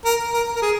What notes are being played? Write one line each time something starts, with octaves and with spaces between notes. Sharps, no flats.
A#4
A#4
A#4
G#4